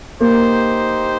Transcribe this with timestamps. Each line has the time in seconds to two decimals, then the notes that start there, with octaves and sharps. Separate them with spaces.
0.20 A#3 D#4 G4 C5